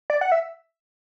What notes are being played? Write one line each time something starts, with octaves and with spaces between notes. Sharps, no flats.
D5
F#5
E5